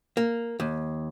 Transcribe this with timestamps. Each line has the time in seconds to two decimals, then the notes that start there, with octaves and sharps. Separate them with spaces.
0.17 A#3
0.60 D#2